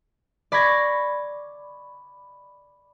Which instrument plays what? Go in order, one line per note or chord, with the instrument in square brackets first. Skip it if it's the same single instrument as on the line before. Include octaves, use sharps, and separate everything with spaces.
[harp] D5 B5 C#6 G#6 A#6